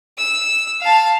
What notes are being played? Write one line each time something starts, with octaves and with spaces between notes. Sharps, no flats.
E6
F5 A5